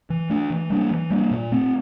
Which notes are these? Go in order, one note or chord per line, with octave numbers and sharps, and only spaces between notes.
E3
A3 D4
E3
G3 A#3 D4
E3
G3 A#3 D4
A#2
A3 C4